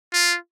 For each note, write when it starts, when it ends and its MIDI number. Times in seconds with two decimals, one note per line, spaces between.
0.13 0.37 65